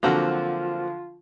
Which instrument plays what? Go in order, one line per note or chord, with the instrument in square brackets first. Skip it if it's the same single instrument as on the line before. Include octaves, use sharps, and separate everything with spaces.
[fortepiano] D3 F3 F#3 [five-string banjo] A#3 C4 F#4 [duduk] F4